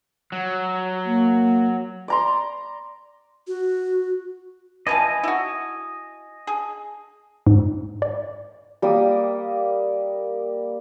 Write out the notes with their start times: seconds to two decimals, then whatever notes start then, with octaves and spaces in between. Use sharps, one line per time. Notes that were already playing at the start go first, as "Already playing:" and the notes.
0.32 F#3
1.05 A#3
2.08 D5 A#5 C6
3.47 F#4
4.87 E3 F3 D#5 F5 G#5
5.23 E4 F#4
6.47 G#4
7.47 G#2
8.02 D5
8.82 G3 A#3 A#4 D#6